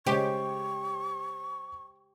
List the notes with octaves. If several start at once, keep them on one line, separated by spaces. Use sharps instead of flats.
C#3 G#3 G4 C5 C#5 C#6